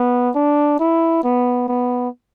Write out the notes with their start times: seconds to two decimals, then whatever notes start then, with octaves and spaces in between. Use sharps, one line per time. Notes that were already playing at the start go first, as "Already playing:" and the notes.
Already playing: B3
0.35 D4
0.80 E4
1.24 B3
1.68 B3